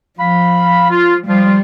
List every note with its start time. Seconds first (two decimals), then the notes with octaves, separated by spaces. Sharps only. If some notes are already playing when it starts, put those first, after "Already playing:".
0.19 F3 F5 B5
0.90 F4
1.28 F3 G3 F4